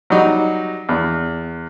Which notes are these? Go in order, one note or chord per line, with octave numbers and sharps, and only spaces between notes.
F#3 G3 D#4
E2